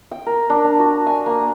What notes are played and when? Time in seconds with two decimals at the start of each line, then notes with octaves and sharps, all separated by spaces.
0.11 G5
0.26 A#4
0.50 D4
0.64 D4
0.79 F#4
1.06 G#5
1.26 A#3